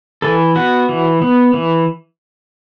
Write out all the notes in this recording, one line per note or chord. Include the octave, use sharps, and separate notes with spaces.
E3 A4
B3 F#4
E3
B3
E3